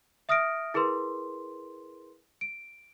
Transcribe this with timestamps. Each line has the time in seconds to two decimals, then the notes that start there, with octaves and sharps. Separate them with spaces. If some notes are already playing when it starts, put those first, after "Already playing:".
0.29 E5 D#6 F6 A#6 D7
0.74 E4 G#4 A#4 B4 C6
2.41 D7